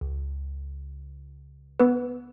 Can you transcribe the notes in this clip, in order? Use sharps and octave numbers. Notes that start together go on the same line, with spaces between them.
C#2
B3 B4